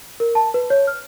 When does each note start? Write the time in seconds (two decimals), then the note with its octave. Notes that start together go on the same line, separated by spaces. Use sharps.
0.20 A#4
0.35 A5
0.54 B4
0.70 C#5
0.87 F6